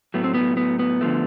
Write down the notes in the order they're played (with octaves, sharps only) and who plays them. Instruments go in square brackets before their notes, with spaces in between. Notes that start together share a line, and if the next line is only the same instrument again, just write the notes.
[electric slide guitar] A2 F#3 A3 B3
C4
B3
B3
B3
D3 F3 A3